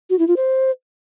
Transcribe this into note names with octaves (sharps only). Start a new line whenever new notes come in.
F#4
E4
F4
C5